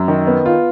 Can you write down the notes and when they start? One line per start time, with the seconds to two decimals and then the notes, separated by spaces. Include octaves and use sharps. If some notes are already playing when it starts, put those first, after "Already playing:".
Already playing: F#2
0.08 D#3
0.27 B3
0.46 F4